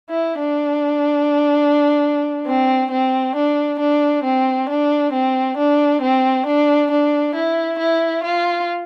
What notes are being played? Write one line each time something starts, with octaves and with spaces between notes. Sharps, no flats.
E4
D4
C4
C4
D4
D4
C4
D4
C4
D4
C4
D4
D4
E4
E4
F4